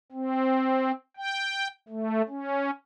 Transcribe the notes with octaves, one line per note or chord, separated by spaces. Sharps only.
C4
G5
A3
C#4